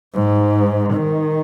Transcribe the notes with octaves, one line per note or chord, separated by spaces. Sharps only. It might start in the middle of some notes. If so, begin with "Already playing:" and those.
G#2
D#3